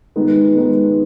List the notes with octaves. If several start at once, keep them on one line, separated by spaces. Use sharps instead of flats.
G#2 D#3 G#3 B3
G#2 D#3 G#3 B3